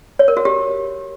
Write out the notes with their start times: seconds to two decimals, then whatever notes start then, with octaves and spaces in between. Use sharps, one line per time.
0.19 C#5
0.28 A#4
0.37 F#4
0.45 G4